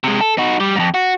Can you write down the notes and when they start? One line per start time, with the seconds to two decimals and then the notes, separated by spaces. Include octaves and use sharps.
0.04 C3 G#3
0.21 A4
0.38 D#4 F#4
0.60 G3
0.76 F2 G#2
0.94 F#4